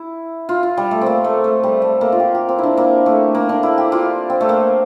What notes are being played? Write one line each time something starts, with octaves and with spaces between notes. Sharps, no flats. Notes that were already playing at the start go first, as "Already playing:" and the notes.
Already playing: E4
F4
F4
G3
A3
A#3 C4
A3
A3
G3
A3
A#3
F4
G4
G4
C4
D4 E4
A#3
A3
A#3
D4
E4
G4
F4
C4
A3
A#3